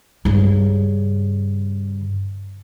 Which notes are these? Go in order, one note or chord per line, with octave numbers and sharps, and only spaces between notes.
G2 C#3